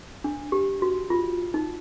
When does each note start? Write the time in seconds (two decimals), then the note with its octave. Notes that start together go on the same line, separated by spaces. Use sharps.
0.24 D4
0.52 G4
0.82 F#4
1.10 F4
1.54 D#4